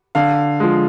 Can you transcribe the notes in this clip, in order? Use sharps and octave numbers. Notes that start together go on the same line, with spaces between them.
D3 F5
F3 G#3